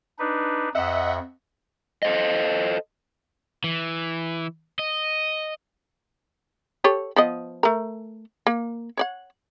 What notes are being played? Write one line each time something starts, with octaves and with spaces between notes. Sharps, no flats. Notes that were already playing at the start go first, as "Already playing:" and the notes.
D4 D#4 B4
F2 D#5 E5 F#5
A4 C5 D#5
E3
D#5
G4 A4 C#5
F3 B3 D#5
A3 A#4
A#3
C#5 D5 F#5